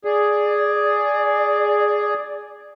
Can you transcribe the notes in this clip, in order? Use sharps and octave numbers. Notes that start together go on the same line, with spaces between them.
G#4 D5